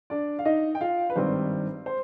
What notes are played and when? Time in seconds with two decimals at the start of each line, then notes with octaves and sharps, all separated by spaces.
0.10 D4 D5
0.39 F5
0.45 D#4 D#5
0.75 G5
0.81 F4 F5
1.10 B4
1.16 G#1 G2 D#3 G3 C4 C5
1.86 C5